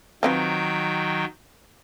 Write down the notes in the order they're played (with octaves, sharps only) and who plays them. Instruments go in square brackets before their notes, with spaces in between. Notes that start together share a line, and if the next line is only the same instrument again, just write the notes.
[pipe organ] D#3 F#3 G5 [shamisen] F3 C4 B4